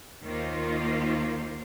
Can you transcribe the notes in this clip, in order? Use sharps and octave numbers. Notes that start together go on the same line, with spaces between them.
D#2 D#3 A#3 F4 C5